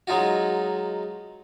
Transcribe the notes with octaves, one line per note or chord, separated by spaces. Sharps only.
F#3 G#3 D#4 F4 F#4